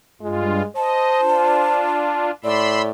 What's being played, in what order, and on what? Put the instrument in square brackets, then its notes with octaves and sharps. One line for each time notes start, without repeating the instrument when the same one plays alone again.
[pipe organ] G2 F4 [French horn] G#3
[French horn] C5 [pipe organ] D#5 [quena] A5
[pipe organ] D4 F4
[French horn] A2 [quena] D5 [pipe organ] B5 C6 E6